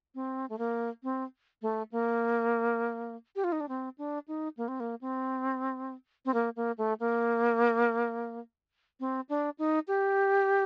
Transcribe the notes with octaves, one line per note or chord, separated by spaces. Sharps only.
C4
A3
A#3
C4
A3
A#3
G4
F4
D#4
D4
C4
D4
D#4
A#3
C4
A#3
C4
C4
A#3
A#3
A3
A#3
C4
D4
D#4
G4